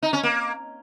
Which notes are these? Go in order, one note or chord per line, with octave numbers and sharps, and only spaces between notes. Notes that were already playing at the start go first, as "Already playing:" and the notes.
D#4
C#4
A#3